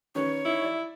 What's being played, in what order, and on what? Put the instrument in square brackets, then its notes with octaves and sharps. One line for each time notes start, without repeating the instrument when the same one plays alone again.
[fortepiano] D#3 C#4 B4 [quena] C#5
[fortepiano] D#4 [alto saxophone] E4
[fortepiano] D5 E5